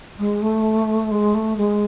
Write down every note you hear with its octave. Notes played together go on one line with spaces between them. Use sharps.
G#3
A3
G#3
A3
G#3